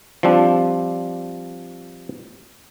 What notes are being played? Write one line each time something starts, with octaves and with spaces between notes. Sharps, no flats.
F3 G3 C4 D4